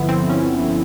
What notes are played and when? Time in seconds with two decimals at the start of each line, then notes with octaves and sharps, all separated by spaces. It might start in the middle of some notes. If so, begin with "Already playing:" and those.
Already playing: G1 D3 F3 B3 E4
0.09 C4
0.30 C#4